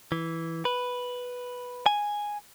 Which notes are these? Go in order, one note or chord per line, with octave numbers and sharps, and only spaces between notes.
E3
B4
G#5